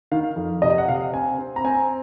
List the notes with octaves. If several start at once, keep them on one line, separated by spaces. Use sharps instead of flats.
D#3 F5
F2
C3 D#5
F#5
C3 F5
C4 G#5
C4
A#5
C4 G#5